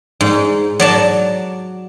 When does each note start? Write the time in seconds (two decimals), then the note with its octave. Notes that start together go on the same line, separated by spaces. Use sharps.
0.21 G#2
0.80 F#3 D5 A5